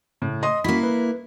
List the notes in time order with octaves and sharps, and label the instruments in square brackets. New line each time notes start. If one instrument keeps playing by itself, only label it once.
[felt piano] A2 [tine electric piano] C#3 A3
[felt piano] D#5 C6 D#6
[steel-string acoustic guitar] A#3 E4 [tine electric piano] C#4 F#4 B6 [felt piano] B5
[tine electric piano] B4